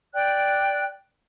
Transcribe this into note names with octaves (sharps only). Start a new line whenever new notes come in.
D5 G5 F#6